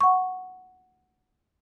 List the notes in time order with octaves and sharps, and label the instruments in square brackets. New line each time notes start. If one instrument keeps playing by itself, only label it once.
[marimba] F#5 C#6